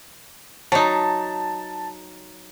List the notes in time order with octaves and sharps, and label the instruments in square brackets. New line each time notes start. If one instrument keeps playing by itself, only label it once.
[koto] F#3 D#4 [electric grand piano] A5